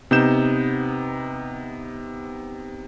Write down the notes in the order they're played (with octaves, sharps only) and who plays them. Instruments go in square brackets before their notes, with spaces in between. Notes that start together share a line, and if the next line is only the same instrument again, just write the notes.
[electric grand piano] C3 B3 D#4 G6 E7